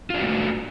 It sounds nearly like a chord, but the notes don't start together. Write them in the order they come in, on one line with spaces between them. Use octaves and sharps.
F4 D4 F#4 A3